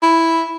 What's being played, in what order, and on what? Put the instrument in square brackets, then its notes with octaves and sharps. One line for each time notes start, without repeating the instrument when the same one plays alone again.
[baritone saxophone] E4